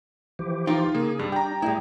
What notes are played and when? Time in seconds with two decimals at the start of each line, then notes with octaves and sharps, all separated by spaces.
0.39 E3 F3 G4
0.67 D#4 F4 G5
0.95 C#3 A#3 G#4
1.19 G2 G3
1.32 D4 G5 A#5
1.62 A2 G3 A3 E4 G#4